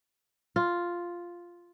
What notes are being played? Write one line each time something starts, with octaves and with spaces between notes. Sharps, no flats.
F4